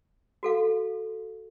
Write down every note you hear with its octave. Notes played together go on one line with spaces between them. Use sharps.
F#4 A4 F5